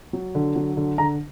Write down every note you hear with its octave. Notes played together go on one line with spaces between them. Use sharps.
F#3
D3
F#3
D3
D3 A#5